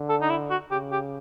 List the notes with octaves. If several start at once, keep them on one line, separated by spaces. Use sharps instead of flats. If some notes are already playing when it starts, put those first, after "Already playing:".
Already playing: D3
A4
D#4
E4
F#4
C#3 G4
G4